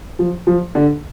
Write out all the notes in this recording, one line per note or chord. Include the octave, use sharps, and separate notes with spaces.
F3
F3
D3